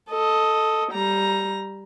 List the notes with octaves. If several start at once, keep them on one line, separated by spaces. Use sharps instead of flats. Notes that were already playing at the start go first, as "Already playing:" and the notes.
A4 D#5
G3 A#5